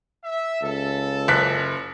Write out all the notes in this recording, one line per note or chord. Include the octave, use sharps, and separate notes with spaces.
E5
C#2 A4
F#1 F#6 B6